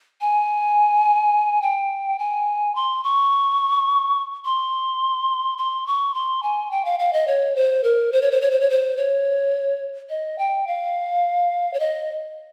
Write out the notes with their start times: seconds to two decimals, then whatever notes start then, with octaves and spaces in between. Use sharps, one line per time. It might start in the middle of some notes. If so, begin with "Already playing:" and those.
0.21 G#5
1.62 G5
2.19 G#5
2.75 C6
3.04 C#6
4.45 C6
5.58 C6
5.87 C#6
6.14 C6
6.43 G#5
6.71 G5
6.85 F5
6.99 F5
7.13 D#5
7.27 C#5
7.56 C5
7.84 A#4
8.12 C5
8.22 C#5
8.31 C5
8.41 C#5
8.51 C5
8.60 C#5
8.70 C5
8.97 C#5
10.10 D#5
10.39 G5
10.67 F5
11.74 C#5
11.80 D#5